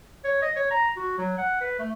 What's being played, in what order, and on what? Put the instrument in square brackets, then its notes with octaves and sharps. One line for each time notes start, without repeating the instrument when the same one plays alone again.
[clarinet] C#5
D#5
C#5
A#5
F#4
F#3
F#5
B4
A3